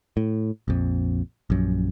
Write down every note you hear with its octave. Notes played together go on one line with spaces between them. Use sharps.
A2
A#1 F2
A#1 F#2